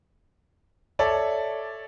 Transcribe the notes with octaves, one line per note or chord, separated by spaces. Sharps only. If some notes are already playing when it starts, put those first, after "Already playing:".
A4 C#5 D5 E5